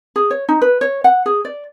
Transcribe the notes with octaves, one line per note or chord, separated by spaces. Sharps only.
G#4
C#5
D#4
B4
C#5
F#5
G#4
D5